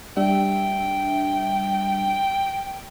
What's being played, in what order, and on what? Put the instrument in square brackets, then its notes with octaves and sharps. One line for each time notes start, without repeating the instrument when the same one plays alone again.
[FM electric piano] G3 D4 E5 [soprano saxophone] G5